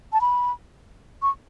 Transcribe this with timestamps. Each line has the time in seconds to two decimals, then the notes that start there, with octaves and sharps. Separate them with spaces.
0.13 A5
0.21 B5
1.22 C#6